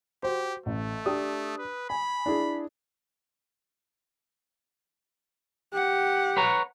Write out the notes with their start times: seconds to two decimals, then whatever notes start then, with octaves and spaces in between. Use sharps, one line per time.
0.23 F#4 G4 C5
0.66 A1 A3
1.06 D4 G4 D#6
1.58 B4
1.90 G#5 B5
2.26 D4 E4 G#4
5.74 G4 F#5
6.37 B4 C#5 A#5